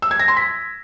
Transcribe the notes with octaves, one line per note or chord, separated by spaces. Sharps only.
E6
G#6
A#6
C6
B6